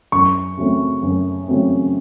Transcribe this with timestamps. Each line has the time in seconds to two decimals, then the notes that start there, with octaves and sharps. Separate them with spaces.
0.12 F#2 C#6
0.57 C#3 F#3 A3 C4
1.03 F#2
1.48 C#3 F#3 A3 C4